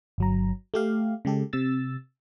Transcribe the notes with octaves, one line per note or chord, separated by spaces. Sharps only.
G1 F#3 A#5
A3 G4 F5
C#3 G#3 G4 A4
C3 E6 A6